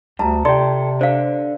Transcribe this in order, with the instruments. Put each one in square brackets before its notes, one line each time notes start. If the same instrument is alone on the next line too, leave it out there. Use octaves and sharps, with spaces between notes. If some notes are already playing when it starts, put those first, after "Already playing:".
[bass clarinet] D2 [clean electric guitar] G3 [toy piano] A5 A#5
[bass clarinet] C3 [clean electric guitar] A4 G5 [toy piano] D5 C6
[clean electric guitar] D3 [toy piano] C5 F5